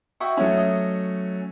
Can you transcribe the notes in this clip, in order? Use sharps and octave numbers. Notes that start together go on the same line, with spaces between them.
E4 F#4 D#5 G5 C#6
F#3 A3 C#4
D#5